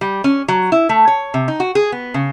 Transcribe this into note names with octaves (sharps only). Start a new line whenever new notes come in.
G3
C#4
F#3
E4
A3
C#5
C3
D#4
F#4
G#4
B3
C#3